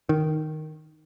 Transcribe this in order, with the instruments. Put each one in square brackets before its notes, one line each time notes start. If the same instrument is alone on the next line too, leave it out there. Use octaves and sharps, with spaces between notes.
[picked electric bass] D#3